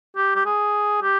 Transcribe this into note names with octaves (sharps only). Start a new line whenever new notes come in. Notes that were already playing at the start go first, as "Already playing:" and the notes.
G4
G4
G#4
G4